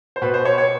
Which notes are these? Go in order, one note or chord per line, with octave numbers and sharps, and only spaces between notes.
C5
B2 B4
C5
C#5
C#5